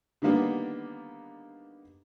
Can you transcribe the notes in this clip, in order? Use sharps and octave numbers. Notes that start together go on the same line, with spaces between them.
D3 D#3 G3 A#3 B3 D4